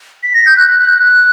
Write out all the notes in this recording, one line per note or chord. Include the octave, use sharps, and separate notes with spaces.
B6
A#6
G6
F#6
F#6
F#6
F#6
F#6